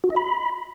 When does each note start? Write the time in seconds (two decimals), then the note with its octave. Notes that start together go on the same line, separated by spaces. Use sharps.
0.04 F#4
0.10 D#5
0.16 B5